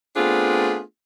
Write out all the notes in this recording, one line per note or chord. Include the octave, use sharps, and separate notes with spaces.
A3 B3 C4 D4 F4 G#4